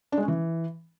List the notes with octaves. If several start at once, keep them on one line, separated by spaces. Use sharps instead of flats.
D4
G#3
C#4
E3